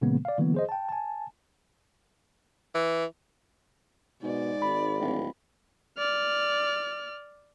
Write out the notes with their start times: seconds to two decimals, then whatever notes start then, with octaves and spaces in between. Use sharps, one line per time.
0.01 A#2 C#3 E3 G#3 A#3 B3
0.25 D5 F5
0.38 D3 E3 F#3 A#3 B3
0.54 G#4 C5 D#5
0.69 G5 A5
0.89 G#5 A5
2.75 E3
4.22 G#2 B2 D5
4.62 G#1 B5
5.00 D1
5.98 D5 F6